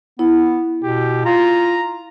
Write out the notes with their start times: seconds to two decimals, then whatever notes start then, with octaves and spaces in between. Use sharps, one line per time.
0.19 B3 E4
0.83 B2 G4
1.26 F4 A#5